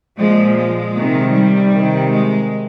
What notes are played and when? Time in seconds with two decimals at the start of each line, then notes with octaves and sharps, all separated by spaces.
0.19 A#2 F3 G#3
0.58 G#3
0.96 C3 D#3
1.34 G3
1.72 C3 D#3
2.11 G#3